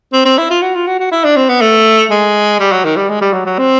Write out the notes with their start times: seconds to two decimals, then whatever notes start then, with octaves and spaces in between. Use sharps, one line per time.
0.13 C4
0.25 C4
0.38 E4
0.50 F4
0.62 F#4
0.75 F4
0.87 F#4
1.00 F#4
1.11 E4
1.24 D4
1.36 C4
1.49 B3
1.61 A3
2.11 G#3
2.60 G3
2.72 F#3
2.84 D#3
2.97 G3
3.09 G#3
3.21 G3
3.33 F#3
3.45 F#3
3.58 C4